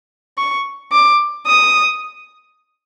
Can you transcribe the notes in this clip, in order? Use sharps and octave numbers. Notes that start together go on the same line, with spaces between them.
C#6
D6
D#6